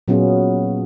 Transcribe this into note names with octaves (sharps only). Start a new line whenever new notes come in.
A#2 F#3 B3 C#4 F4 G#4